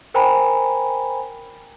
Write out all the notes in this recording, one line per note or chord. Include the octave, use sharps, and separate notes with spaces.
A#4 C5 G5 G#5 A#5 B5